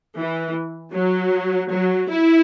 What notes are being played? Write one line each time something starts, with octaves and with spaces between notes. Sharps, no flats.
E3
F#3
F#3
E4